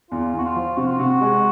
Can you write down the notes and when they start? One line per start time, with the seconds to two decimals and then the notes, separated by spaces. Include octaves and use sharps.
0.11 E2 F4
0.34 E2 F#4
0.44 F4
0.56 F3
0.77 C3 F#4
0.87 F4
0.98 C3 F#4
1.21 G#3